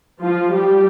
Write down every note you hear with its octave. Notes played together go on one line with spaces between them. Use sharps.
F3 F4
G3 G4